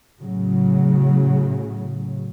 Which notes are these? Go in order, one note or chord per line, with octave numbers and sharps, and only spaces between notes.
A2 C#3 F#3